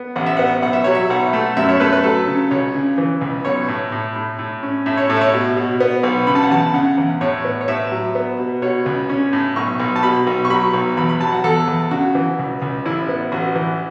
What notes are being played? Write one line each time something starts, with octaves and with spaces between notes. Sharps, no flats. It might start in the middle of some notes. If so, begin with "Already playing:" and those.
Already playing: B3
A1 F#5
E5
B3 F#5
B1 F#5
E5
F#3 C#5
E5
B1 F#5
A3
F#2 E5
C#5
A3 B4
B4
F#3 A4
C#3
C#2 C#5
C#3
E3
C#2
B1 C#5
A2
A2
A2
A2
C#4
A2 E5
C#5
A2 A4
E5
C#5
B2
B2
B3
B1
C#3 B5
A5
F#5
E2 A5
C#3 F#5
E2
A2 C#5
B3
C#5
A2 E5
F#3
B3
B2
B2 C#5
C#2
C#4
A2
B1 C#6
B1
A5
B2 B5
B1
C#6
F#3 B5
B1
E2 B5
B5
F#3 A5
F#5
E2 A4
E2
C#3 F#4
E3
C#2
C#2
A1 E4
B3
A1 F#4
E3